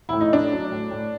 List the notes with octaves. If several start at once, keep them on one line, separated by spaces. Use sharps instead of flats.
A2 E4
D#4
A2 D4
F#3
A2
A2